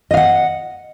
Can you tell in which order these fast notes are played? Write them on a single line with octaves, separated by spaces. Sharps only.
D#5 F5 F#5